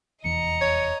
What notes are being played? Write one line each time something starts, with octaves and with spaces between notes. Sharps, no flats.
F1 E2 E3 D#5 A#5 C#7
C#5